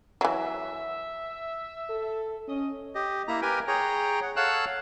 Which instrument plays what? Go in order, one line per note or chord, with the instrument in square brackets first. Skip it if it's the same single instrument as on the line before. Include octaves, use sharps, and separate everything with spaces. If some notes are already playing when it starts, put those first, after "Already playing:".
[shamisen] E3 F#3 [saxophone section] E5
[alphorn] A4
[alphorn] C#4 [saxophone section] D#5
[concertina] G4 D#5
A#3 E4 A#5
G4 A#4 B4 G5 G#5
G#4 C#5 G5 A#5
F#5
A4 C#5 F5 F#5 E6 F#6